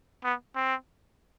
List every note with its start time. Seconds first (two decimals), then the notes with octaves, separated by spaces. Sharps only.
0.24 B3
0.56 C4